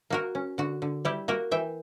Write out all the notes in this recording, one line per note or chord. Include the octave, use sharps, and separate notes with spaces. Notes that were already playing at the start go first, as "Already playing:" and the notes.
A#3 F#4 A#4
C#4
D3 F#4
D3
G3 E4 G4
A#3 F#4 A#4
E3 E5 G5